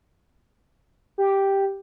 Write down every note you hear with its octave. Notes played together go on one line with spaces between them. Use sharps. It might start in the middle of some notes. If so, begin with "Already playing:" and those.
G4